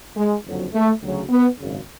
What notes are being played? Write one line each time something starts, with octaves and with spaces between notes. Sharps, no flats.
G#3
F#1 F2 D3 F#3
A3
D2 C#3 F#3
B3
G#1 F#2 C#3